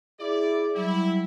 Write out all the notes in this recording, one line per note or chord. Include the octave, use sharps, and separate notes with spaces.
E4 G#4 D5 D6
F#3 G3 E4